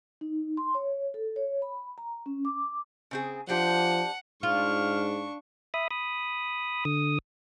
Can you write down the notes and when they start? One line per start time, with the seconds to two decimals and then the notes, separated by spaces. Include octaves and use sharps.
0.21 D#4
0.57 C6
0.75 C#5
1.14 A4
1.36 C#5
1.62 B5
1.98 A#5
2.26 C#4
2.45 D6
3.11 C#3 C4 G#4
3.49 F3 D4 G4 C5 F#5
4.43 G#2 D4 F4 C#6 F6
5.74 E5 B5 D#6
5.91 B5 D#6
6.85 D3 D#6